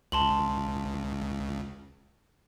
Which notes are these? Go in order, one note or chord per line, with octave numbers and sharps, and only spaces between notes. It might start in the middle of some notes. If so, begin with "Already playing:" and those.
C#2 A5 C6 F#7